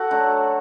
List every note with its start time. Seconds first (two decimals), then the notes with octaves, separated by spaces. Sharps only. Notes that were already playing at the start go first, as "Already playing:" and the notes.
Already playing: F#4 A4
0.11 D3 F#3 A3